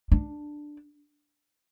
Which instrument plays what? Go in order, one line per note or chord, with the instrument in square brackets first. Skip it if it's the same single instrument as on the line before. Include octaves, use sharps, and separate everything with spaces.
[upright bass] D4